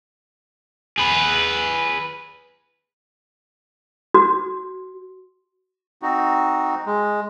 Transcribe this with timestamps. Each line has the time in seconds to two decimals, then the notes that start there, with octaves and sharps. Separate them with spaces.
0.98 G#4 B4
4.14 F#4
6.02 C4 D#4 F#4
6.86 G#3